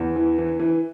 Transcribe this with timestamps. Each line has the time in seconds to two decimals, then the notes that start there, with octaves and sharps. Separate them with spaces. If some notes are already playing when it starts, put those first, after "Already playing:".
Already playing: E2
0.16 E3
0.38 E3
0.60 E3